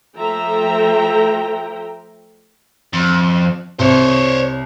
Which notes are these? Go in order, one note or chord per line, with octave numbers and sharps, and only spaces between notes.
F3 A3 A4 E5 G5 A#5
F2
C2 C5 C#5